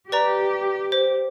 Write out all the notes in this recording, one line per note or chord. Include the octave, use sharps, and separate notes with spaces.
G4 B4 D5 A#5
C5